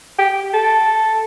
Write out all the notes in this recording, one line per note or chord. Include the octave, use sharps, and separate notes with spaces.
G4
A4